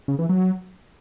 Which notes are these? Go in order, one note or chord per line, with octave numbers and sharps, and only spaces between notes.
C#3
E3
F#3